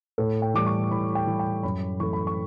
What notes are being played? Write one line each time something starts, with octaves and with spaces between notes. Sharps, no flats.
A2 A4
G5
E3 G3 D6
C#6
A2 B5
G5
E3 G3
G5
F#2 B5
E3 A3 C#6
B5
C#6